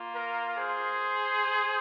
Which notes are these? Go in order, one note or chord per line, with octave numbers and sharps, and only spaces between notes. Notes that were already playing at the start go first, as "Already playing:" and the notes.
Already playing: A#3 F4
A#4
G#4 C5